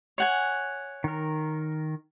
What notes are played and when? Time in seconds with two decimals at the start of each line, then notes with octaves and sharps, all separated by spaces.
0.18 C#5 F#5 G#5
1.04 D#3 A#4